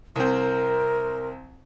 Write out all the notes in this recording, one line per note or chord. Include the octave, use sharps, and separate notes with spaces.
C2 C4 A#4